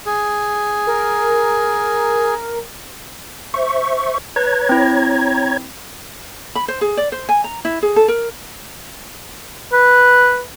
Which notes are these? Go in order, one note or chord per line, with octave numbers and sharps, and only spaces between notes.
G#4
A#4
C5 E5 C#6
B4 C#5 A#5 G#6
C4 E4
B5
C5
G#4
D5
C5
G#5
A#5
E4
G#4
A4
A#4
B4